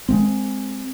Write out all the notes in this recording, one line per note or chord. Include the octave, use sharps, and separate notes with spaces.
G#3 A3 C4